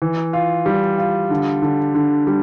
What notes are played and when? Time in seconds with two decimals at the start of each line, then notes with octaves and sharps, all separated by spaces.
0.02 E3
0.33 F4
0.66 G3
0.98 F4
1.30 D3
1.62 D3
1.95 D3
2.27 G3